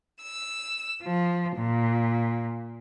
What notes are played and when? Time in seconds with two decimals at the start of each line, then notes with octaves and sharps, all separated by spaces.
0.23 E6
1.02 F3
1.57 A#2